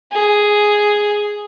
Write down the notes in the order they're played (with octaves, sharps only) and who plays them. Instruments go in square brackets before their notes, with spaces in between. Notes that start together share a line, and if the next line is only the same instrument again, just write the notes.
[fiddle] G#4